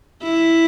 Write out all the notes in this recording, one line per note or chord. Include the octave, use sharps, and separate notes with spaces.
E4